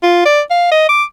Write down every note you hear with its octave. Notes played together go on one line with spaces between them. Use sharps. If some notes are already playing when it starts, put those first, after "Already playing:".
F4
D5
F5
D#5
D6